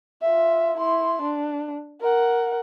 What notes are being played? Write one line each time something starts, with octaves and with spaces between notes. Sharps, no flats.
F4 E5
E4 C6
D4
A#4 F#5